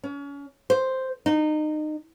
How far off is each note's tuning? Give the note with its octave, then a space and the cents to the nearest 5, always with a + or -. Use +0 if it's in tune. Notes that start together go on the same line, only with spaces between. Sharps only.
C#4 +35
C5 +0
D#4 -25